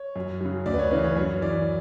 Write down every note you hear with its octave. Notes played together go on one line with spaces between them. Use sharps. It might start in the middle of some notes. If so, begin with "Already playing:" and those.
Already playing: C#5
F#2
C#3 F#3
D2 D5
B4
C#5
C#3 E3 B4
C#5
F#2 C#5
E3 D5